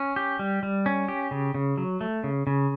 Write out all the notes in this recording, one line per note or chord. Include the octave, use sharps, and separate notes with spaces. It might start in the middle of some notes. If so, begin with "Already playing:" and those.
Already playing: C#4
G4
G3
G3
C#4
G4
C#3
C#3
F#3
A3
C#3
C#3